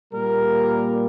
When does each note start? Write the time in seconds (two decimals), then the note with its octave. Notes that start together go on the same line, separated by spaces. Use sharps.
0.13 A#2 G3 A#3 A#4